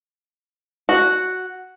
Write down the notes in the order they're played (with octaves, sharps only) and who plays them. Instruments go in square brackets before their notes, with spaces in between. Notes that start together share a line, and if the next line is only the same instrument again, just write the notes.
[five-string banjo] F#4